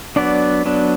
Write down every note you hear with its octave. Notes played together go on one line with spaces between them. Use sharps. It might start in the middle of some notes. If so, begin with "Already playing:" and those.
F#3 B3 D4 D5
F#3 B3 D4